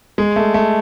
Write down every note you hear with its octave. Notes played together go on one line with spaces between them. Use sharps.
G#3
A3
A3